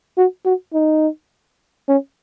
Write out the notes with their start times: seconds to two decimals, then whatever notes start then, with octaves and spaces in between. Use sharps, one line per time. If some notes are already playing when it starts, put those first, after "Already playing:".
0.17 F#4
0.45 F#4
0.74 D#4
1.88 C#4